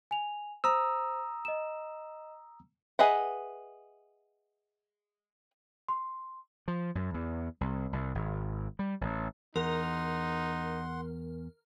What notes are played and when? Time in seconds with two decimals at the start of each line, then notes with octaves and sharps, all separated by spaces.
0.11 G#5 F7
0.64 C5 A#5 D#6 E6
1.45 D#5 E7
2.99 G#4 B4 D#5 E5 F#5
5.88 C6
6.68 F3
6.95 F#2
7.14 E2
7.61 C2
7.93 C2
8.15 G#1
8.79 G3
9.01 A1
9.56 E2 D#4 A#4 F#5 C6